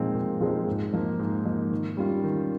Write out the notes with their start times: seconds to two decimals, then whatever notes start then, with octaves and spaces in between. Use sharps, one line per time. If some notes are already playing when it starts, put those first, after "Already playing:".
Already playing: A#2 F3 G#3 C4 D#4
0.15 A#2
0.40 F3 G#3 C4 D#4
0.67 G#2
0.93 F3 A#3 D#4
1.19 G#2
1.45 F3 A#3 D#4
1.71 D#3
1.97 G3 C#4 F4
2.24 D#3